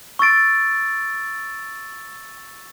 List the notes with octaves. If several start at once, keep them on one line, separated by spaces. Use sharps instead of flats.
C#6 E6 A6 D7